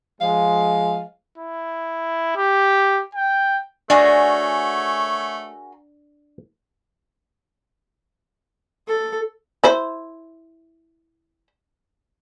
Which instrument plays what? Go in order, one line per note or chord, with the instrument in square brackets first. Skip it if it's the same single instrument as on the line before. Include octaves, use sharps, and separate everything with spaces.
[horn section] F3 G#3 [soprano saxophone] F5
[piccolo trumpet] E4
G4
G5
[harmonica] A3 C#5 [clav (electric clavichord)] D4 [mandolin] F#4 G#4 A#4
[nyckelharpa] A4
[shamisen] E4 C5